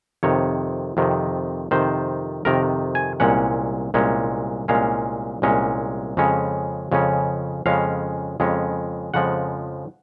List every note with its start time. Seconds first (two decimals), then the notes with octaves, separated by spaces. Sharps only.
0.23 F2 C3 D#3 C#5
0.97 F2 C3 D#3
1.71 F2 C3 D#3 C5
2.45 F2 C3 D#3 A#4
2.95 G#5
3.20 C2 A#2 G#3 C#4 F#5
3.94 C2 A#2 G#3 C#4
4.68 C2 A#2 G#3 C#4 F5
5.42 C2 A#2 G#3 C#4
6.17 F2 C#3 G#3 C#4
6.92 F2 C#3 G#3 C#4
7.66 F2 C#3 G#3 C#4 F5
8.40 F2 C#3 G#3 C#4
9.14 F2 C#3 F3 G#3 F#5